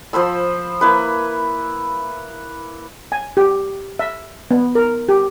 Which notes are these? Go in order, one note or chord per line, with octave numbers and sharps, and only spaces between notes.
F3 C5 B5 E6
A#3 E4 B4
G#5
G4
E5
B3
A#4
G4